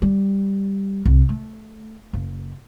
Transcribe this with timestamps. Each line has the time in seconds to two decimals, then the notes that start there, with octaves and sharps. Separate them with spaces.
0.02 G3
1.06 C2
1.29 A3
2.13 F#1